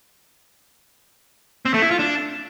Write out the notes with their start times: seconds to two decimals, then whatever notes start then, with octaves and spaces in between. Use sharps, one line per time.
1.65 C4
1.74 A3
1.82 E4
1.91 F4
1.99 D4